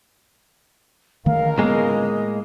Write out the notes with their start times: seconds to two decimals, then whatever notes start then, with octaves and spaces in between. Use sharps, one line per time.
1.26 C#2 D3 D#3 A3 A#4 F5
1.58 A2 G#3 A#3 B3 D#5